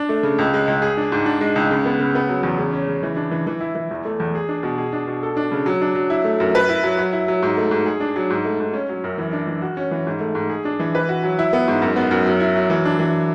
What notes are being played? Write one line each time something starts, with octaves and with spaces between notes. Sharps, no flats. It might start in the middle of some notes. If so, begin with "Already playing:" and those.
Already playing: D4
A3
C#3
C#2
G#3
C#2
G#4
D4
G#2
D4
G#3
C#2
C#3
B3
C#3
B3
F#3
E2
C#3
C#4
C#3
E3
D4
E3
E3
E4
E3
E2
A3
E2
G#4
D4
B2
G#4
D4
B2
A4
D4
C#3
F#3
D4
F#3
E4
A3
F#2
B4
E4
F#3
F#3
E4
F#3
G#2
A3
G#2
G#4
D4
F#3
G#2
A3
G#2
C#4
F#3
F#2
E3
D4
E3
F#4
C#4
E3
G#2
A3
G#2
G#4
D4
E3
B4
F#4
F#3
E4
B3
G#2
F#2
B3
F#2
F#3
E4
F#3
E3
D4
E3